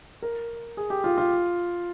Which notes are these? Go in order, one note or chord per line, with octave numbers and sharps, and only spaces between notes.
A#4
G#4
G4
F4
F4